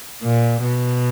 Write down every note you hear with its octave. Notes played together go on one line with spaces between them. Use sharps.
A#2
B2